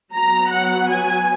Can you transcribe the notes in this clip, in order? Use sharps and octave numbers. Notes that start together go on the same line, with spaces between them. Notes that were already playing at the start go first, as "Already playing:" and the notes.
F#3 B3 A#5
F#5
G#5